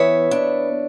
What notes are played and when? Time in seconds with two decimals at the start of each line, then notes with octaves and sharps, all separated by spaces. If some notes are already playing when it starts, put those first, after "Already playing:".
Already playing: E3 B3 C#5 E5
0.31 D4